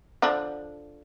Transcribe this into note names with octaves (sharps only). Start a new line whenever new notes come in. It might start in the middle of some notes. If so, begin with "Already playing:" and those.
D3 F3 D4